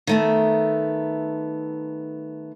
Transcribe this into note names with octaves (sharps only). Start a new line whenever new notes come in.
D#3 A3 B3